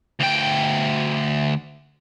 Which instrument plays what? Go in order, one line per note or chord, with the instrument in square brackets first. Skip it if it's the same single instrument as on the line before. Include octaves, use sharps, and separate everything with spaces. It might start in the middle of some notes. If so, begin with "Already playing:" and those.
[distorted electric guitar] D2 G5